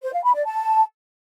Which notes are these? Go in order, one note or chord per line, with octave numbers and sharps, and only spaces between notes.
C5
F5
B5
D5
A5